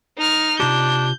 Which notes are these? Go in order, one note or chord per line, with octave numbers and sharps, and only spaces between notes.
D#4 F6
C3 D4 F4 G4 G6